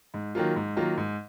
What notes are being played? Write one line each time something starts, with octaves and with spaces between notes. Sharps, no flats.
G#2
D#3 F#3 A#3 F4
G#2
D#3 F#3 A#3 F4
G#2